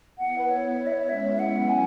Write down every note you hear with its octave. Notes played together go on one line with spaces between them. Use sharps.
B3 E4 F#5
B4
C#5
B3 E4
C#5
E5
C#5
G#3 C#4 E5
E5
F#5
F#3 B3
G#5